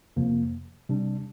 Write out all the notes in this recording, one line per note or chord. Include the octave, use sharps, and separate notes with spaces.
F2 C3 F3 A#3
C3 G3 D4